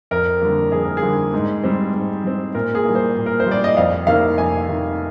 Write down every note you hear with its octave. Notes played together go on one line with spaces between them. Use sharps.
F2 A#4
D3 G3 A#3
F2 G#4
A#4
G#4
D3 G3 A#3
G#2
G3 C4
G#2
G3 C4
A#2 A#4
G#4
G3 A#3
C5
A#2
A#4
C5
G3 A#3 D5
D#5
F2 F5
C3 D#3 A#3 F5
F2 G#5
C3 D#3 A#3